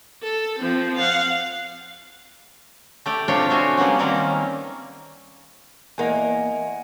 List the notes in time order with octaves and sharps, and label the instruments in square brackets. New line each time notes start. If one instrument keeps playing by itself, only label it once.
[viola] A4
F3 C4
F5 F#5
[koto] A3 G4 D5
C3 F3 D4 F4 C#5 G5
A3 F#4 C5 G#5
F#3 G3 A#3 B3 C#4
D#3 G3 A#3 C4 C#4
[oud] E2 A#3 [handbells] D#5 F#5 G#5